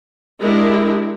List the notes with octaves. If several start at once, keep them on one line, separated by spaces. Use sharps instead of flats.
G#3 D4 E4 G4 G#4 A#4